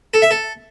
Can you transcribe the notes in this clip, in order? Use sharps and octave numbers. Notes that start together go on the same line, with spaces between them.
A4
E5
A4